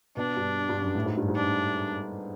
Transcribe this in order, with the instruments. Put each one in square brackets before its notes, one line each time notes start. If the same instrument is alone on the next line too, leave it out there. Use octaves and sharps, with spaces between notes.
[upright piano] B2 [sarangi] D4
[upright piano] G2
G2
F#2
A2
G#2
G2
G#2
[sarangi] D4